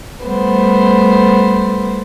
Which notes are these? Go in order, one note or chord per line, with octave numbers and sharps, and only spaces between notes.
G3 A3 B3 C5